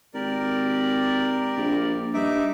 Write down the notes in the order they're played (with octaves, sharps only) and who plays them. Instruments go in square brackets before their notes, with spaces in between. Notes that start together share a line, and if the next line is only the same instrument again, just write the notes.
[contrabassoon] G#1 [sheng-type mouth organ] G4 A#4 D5
[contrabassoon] A#1
[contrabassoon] G2 [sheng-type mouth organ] D#4 E5 D6